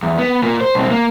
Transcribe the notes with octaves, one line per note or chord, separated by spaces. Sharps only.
E2
B3
A#2 A#3
C5
B1 C4
A#3